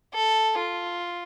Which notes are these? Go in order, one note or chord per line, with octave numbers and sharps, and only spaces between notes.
A4
F4